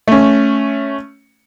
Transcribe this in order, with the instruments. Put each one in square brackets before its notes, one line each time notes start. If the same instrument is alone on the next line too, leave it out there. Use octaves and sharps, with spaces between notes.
[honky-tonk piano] A3 C#4